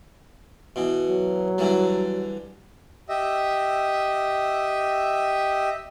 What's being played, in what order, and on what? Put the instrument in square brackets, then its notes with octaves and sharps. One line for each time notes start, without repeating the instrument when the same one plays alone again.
[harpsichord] B2 E3
[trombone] F#3
[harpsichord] D3 E3 G3
[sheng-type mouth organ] G4 D#5 E5